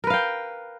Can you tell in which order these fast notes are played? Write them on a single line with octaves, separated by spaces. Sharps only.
A#4 B4 F5 G5